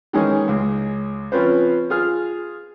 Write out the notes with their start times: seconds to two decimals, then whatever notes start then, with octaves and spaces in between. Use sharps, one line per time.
0.13 D#3 E3 G#3 C#4 D#4
0.48 C#2 G#3
1.32 F3 C4 C#4 F4 B4 C5
1.90 F4 G#4 F6